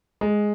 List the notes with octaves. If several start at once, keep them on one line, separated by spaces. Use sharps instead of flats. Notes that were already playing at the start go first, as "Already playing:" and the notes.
G#3